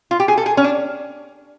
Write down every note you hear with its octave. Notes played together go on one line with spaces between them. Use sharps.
F4
G4
G#4
A4
G#4
C#4
D4